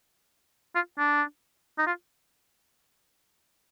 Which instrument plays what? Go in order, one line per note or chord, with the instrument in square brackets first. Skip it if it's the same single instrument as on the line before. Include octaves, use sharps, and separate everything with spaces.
[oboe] F4
D4
D#4
F4